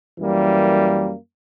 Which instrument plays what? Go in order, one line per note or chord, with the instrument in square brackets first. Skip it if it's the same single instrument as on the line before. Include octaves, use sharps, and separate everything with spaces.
[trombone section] F#2 E3 G3 A#3